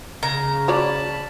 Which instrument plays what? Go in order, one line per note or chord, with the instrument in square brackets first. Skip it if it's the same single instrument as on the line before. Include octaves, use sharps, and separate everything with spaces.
[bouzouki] C#3 [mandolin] A#5
[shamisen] F#4 C#5 D5 [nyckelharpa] A5 B5